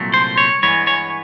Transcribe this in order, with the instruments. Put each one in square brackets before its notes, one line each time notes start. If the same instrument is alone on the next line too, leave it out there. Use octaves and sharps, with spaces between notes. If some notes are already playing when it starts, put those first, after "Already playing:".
Already playing: [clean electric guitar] C2 A#2 F#3 A3
C5
C#5
G2 E3 G#3 B3 C#5
C#5